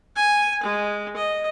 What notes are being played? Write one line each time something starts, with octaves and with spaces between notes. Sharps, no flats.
G#5
G#3
D#5